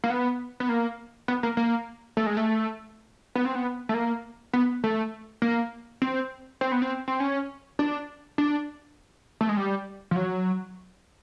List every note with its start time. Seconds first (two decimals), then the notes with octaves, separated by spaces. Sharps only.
0.04 A#3
0.10 B3
0.60 B3
0.69 A#3
1.28 B3
1.43 A#3
1.57 A#3
2.17 A3
2.26 G#3
2.37 A3
3.35 B3
3.45 C4
3.55 B3
3.89 A3
3.94 A#3
4.53 B3
4.84 A3
5.42 A#3
6.02 C4
6.61 C4
6.72 B3
6.82 C4
7.08 C4
7.20 C#4
7.79 D4
8.38 D4
9.41 A3
9.49 G#3
9.57 G3
10.11 F3
10.16 F#3